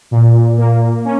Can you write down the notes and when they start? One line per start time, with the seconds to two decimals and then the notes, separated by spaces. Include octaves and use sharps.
0.11 A#2
0.58 A#3
1.05 C#4